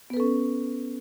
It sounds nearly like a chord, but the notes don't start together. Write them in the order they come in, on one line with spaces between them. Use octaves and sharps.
B3 B4 A4 C#4